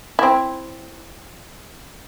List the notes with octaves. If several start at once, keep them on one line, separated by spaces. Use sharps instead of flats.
C4 E4